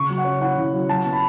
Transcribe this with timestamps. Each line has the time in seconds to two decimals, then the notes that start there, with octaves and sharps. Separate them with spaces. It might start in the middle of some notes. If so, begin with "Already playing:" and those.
Already playing: C#3 C#6
0.09 F#3
0.18 F#5
0.25 C#4
0.41 E4 F#5
0.58 C#3
0.73 F#3
0.89 F#3 A5
1.06 B3
1.13 B5